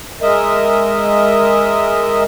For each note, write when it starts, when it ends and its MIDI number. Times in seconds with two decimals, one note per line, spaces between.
0.22 2.24 56
0.22 2.24 70
0.22 2.24 75
0.22 2.24 76